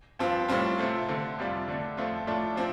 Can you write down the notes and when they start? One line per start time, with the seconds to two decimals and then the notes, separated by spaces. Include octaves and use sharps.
0.19 G2 F3 C4 F4
0.48 A2 G3 C4 F4
0.78 C3 A3 C4 F4
1.08 D3 A3 C4
1.38 F2 C3 G3 D4 F4
1.68 D3 A3 D4
1.97 F2 F3 A3 C4 F4
2.27 A2 A3 D4 F4
2.56 C3 F3 C4